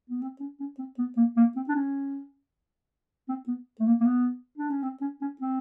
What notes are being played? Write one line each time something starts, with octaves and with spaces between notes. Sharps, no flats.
B3
C4
C#4
C#4
C4
B3
A#3
A#3
C4
D4
C#4
C4
B3
A3
A#3
A#3
B3
D4
C#4
C4
C#4
C#4
C4